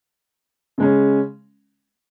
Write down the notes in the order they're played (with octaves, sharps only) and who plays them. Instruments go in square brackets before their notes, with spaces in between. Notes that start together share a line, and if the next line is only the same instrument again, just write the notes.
[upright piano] C#3 G#3 C#4